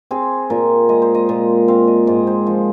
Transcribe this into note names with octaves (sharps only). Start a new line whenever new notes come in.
C4 G#4
A#2 A#4
G#3 D#5
C5
D#5
A#2
C4 F5
D#5
G#2 D#5
C5
F3